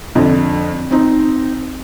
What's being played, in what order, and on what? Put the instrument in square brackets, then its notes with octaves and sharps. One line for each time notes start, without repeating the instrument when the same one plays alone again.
[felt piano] F2 D3
C4 D#4